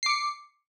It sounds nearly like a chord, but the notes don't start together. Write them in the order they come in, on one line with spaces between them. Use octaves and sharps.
C7 D6 C#7